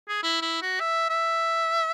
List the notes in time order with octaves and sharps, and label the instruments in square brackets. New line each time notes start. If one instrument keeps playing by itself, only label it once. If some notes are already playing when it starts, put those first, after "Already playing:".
[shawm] G#4
E4
E4
F#4
E5
E5